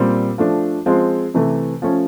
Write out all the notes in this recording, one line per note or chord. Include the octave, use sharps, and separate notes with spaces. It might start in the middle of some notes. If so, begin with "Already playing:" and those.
Already playing: A#2 G3 C4
F3 A3 D4
F3 G#3 C4 F4
C3 E3 A3
F3 A3 C#4